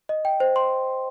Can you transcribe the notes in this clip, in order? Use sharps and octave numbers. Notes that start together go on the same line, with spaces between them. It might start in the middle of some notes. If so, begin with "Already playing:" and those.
D#5
G5
C5
C6